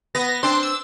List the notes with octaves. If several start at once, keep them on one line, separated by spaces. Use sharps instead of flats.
B3 A#6
C4 D4 C6
E6